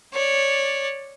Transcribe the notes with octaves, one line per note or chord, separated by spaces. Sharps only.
C#5 D5